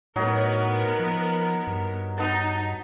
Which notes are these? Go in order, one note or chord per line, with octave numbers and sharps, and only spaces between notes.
A2 F#3 B3 D#4 A#4
F3
G2
B3 D#4 A5